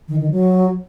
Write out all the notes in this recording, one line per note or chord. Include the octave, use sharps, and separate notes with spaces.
D#3
D#3
F#3